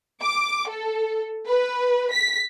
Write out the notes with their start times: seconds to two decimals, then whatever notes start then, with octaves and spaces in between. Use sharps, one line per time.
0.22 D6
0.69 A4
1.47 B4
2.12 B6